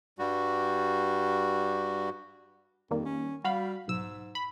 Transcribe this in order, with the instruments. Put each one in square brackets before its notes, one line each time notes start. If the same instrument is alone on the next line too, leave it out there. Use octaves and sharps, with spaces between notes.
[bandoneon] G2 G3 F#4
[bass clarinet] F2 [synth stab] D#3 G3 A#3
[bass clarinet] C#4
[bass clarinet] G3 [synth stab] F#4 F5 B5
[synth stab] B1 E6 [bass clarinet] G#2
[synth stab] B5